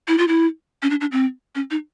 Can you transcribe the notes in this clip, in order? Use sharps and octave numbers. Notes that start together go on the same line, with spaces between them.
E4
F4
E4
C#4
D4
D4
C4
C#4
D#4